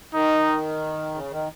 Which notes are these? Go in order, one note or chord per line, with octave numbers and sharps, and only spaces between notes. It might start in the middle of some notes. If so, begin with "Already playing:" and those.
D#3 D#4
C#3
D#3